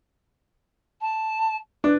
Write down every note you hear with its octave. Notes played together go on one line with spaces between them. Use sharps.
A5
D4 B4